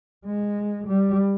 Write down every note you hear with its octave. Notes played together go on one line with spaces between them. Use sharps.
G#3
G3